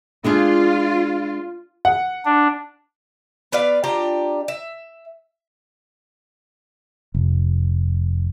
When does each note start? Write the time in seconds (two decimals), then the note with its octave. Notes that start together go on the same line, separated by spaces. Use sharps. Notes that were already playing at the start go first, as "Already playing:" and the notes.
0.24 G#3 D4 F4 G#4
1.85 F#5
2.25 D4
3.52 B3 B4 D5 F5
3.84 D4 F4 G4 A#5
4.48 E5
7.14 F1